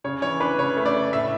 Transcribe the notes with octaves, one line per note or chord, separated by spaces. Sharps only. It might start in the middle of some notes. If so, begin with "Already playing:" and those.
C#3 C#5
E3 C#5
D4 B4
C#3 C#5
A3
D5
A3
A2 E5